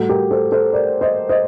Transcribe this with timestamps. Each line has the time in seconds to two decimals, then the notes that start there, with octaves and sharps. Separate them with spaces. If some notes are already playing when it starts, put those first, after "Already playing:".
Already playing: A2 G3 F#4 A4
0.09 G4 A#4
0.31 A4 C5
0.52 A4 C5
0.73 A#4 D5
1.01 C5 D#5
1.29 C5 D#5